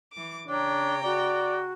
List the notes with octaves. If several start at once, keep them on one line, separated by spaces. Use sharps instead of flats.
E3 D6
C#3 D4 C#5 G5 A#5
F#4 D5